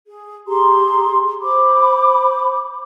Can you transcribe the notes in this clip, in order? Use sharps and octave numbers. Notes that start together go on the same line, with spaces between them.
G#4
G4 G#4 A#5 C6
C5 B5 D6